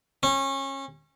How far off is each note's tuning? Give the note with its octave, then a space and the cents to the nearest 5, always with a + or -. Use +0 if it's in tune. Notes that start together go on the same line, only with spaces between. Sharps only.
C#4 -25